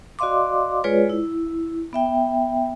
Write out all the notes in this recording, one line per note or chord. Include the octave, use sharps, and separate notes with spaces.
F#4 D5 D#5 F5 C6 D6
G#3 F4 G#4 B4 C#5 D5
E4
B3 E5 G5